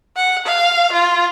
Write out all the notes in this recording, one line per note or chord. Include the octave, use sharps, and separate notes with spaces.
F#5
F5
F4